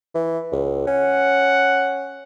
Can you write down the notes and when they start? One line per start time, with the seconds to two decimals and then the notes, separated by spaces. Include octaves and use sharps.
0.15 E3
0.52 C#2
0.87 C#4 F#5